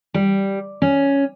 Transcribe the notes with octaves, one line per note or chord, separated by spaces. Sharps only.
G3
C#4